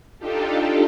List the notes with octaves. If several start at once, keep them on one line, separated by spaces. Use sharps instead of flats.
D4 D#4 F4 G4 A4